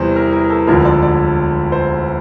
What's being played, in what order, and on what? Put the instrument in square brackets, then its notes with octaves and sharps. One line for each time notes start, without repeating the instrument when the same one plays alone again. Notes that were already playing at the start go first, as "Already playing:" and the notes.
Already playing: [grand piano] E2 C3 E3 G3 C5
A#4
A#4
A4
E1 D2 D3 F3 A#4
D5
D5
C5